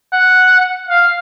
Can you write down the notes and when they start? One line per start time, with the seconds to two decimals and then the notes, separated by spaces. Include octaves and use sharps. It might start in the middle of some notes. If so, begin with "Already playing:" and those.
0.12 F#5
0.89 F5